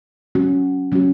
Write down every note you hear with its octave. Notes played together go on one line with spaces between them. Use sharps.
F#3 C#4 F#4
F#3 C#4 F#4